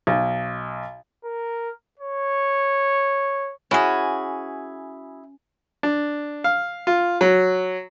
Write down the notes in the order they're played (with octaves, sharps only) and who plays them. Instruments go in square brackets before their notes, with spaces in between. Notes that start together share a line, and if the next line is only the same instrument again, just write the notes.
[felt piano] B1
[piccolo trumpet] A#4
C#5
[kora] C#4 F#4 [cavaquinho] E4 G#4
[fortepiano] D4
F5
F4
F#3